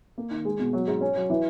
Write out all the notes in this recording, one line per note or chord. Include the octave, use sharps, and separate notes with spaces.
A#3
D#3
G#3
B2
F#3
G#2
C#4
F#3
E3